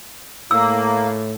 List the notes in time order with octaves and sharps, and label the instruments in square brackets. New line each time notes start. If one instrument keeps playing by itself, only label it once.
[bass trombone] A2 [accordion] A#3 [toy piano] E6